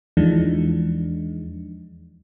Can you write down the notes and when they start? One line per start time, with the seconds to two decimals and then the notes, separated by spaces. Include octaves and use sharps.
0.17 E2 E3 F3 G#3 D4 D#4